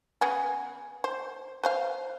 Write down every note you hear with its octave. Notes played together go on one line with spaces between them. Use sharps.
C#3 B3 G#4
C5
B4 C5 F5